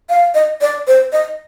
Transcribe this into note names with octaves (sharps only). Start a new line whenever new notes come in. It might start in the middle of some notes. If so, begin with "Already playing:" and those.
F5
D#5
D5
C5
D#5